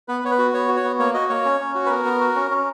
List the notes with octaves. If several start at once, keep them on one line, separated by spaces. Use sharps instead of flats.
B3 B4
B3 C#5
B4
F#4
B3 C#5
F#4
C#5
B3
A#3 C#5
F#4 D#5
A#3 C#5
C#4
C#4
F#4
B4
B3 A#4
B3
F#4
C#4
C#4